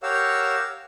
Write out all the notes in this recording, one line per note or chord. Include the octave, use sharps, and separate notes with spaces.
G4 A#4 C#5 F5 F#5 E6